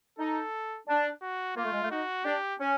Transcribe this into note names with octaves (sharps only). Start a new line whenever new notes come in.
D#4 A4
D4
F#4
A#3 F4
A3
G#3
A3
D#4 F#4
D4 G4
C#4